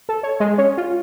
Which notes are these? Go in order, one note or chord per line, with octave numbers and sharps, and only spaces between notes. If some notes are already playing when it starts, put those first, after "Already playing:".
A4
C#5
G#3
C#4
F4